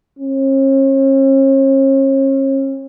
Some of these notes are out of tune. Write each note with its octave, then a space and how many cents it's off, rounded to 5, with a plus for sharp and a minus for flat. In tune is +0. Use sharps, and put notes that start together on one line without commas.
C#4 -40